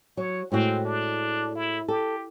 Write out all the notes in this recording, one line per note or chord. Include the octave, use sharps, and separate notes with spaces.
F#3 C#5
A2 G#3 C4 F#4
D4
E4
G4 A4